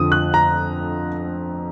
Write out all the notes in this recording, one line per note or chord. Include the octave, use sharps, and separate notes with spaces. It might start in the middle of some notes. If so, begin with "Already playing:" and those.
Already playing: F2 D3 F3 D#6
F#6
A#5